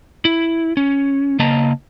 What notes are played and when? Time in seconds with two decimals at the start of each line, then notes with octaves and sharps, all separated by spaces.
0.25 E4
0.77 C#4
1.39 C#3 A#3 D#5 A5 A#5